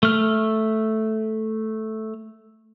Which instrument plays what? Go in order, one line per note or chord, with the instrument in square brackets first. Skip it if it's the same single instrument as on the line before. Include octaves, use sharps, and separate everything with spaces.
[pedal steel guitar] A3 F6